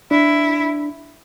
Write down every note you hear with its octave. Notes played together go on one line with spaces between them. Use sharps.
D4 E4